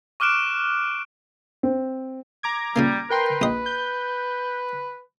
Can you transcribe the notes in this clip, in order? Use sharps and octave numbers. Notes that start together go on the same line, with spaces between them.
C#6 D6 F6 F#6 D7 E7
C4
A#5 D6 G#6
A#2 C#3 G3 A#3
A#4 B4 G5 C6
A#1 D#5
G6